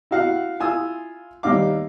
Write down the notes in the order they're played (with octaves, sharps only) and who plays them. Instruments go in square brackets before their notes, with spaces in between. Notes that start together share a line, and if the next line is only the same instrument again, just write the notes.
[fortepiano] E4 F#4 F5 F#5
E4 F4 G#5 D#6 E6
D#2 G3 D#4 F5 D6